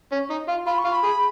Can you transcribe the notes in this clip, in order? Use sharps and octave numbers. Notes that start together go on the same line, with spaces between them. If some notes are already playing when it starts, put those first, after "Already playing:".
C#4
D#4
F4
F4 B5
C#6
F4
B5
G#4